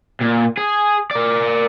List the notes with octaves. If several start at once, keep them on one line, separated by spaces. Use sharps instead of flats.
A#2
G#4
A#4 D5